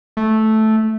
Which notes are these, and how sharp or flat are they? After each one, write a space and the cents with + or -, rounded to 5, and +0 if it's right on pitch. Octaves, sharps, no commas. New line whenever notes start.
A3 -10